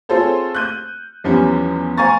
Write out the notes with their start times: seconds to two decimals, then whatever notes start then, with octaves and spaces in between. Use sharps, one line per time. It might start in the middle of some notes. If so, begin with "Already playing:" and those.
0.09 C4 F4 G#4 A4 C5 C#5
0.55 F#6 G6 D#7
1.24 E2 E3 F3 G3 C#4
1.98 C5 F5 G#5 A#5 C#6 A6